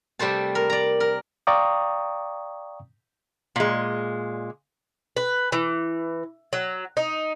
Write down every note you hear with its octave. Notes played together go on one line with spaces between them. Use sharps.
C3 G3 A3 C5 A5
A#4
D5 A#5
A#4
D5 F5 G5 A#5 C#6 D#6
A#2 G#3
B4
E3
F#3
D#4